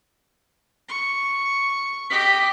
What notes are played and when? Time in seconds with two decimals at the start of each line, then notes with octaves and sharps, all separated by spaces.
0.89 C#6
2.10 G4 D#5 B6